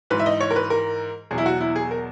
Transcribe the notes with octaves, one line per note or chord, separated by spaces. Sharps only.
G#2 E3 B4
E5
D#5
C#5
A#4
B4
A#4
E2 B2 F#3 G#4
E4
F#4
E4
G#4
A#4